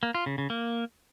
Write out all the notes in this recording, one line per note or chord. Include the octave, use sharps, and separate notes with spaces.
A#3
F4
C#3
C#3
A#3